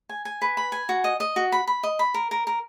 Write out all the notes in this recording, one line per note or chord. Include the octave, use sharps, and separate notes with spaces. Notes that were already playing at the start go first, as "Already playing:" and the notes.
G#5
G#5
B4
B5
G#5
F#4
D#5
D#5
F#4
B5
B5
D#5
B5
A#4
A#4
A#4